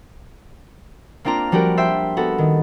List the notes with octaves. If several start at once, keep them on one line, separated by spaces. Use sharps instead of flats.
A#3 C4 D4 F4 A#5
F3 G3 D4 F#4 G4 A#4
C5 E5 G5
B3 F#4 A4
D#3